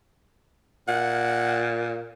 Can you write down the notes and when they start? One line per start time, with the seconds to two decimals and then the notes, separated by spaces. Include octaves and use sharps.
0.88 A#2 F#5